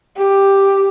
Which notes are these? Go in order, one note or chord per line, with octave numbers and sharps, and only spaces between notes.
G4